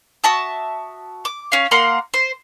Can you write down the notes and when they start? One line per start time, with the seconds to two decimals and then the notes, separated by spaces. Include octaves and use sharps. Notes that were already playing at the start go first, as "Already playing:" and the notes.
0.24 F#4 E5 A5 D#6
1.25 D6
1.52 C#4 F5
1.71 A#3 F#5 C6
2.14 C5